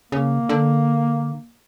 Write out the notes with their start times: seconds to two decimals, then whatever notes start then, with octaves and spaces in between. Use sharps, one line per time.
0.12 C#3 A#3
0.49 D3